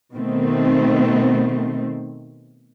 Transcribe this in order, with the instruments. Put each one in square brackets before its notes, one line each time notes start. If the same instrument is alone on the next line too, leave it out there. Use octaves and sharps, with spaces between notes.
[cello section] B2 D#3 A3 C4